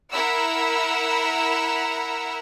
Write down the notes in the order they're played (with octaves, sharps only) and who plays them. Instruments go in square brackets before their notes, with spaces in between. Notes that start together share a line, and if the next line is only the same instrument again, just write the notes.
[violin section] E4 A#4 F#5 A#5 B5 E6